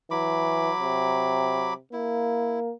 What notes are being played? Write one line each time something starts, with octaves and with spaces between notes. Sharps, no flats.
E3 F#3 B5 D6
C3
A#3 E4